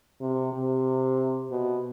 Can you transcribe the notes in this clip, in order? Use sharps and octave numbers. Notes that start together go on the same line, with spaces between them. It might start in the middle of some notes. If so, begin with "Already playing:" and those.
C3
C3
B2